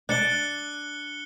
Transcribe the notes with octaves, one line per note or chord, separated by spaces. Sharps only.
D4 D5 F#6 C#7 G7